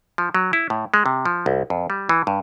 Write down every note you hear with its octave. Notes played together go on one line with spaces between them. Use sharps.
F3
F#3
E4
A2
G#3
C3
F3
C2
F2
G3
E3
G2